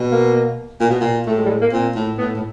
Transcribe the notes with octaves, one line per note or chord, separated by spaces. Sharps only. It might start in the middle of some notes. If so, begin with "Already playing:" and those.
Already playing: B2
A#3
A#2
B2
A#2
A2 A3
G#3
G3
G#3
A#3
A#2 C4
A2
A2 B3
A2